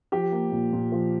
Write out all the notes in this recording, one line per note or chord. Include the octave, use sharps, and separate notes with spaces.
F3 G4
A#3
A#2
A#2
F3